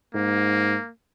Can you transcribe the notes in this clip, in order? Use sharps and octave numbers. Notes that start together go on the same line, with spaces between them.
G#2 A#3